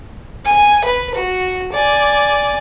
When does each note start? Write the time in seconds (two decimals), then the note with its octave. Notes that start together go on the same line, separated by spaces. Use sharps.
0.45 G#5
0.85 B4
1.14 F#4
1.72 D5 G#5